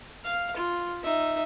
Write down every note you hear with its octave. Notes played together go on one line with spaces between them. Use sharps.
F5
F4
D#4 E5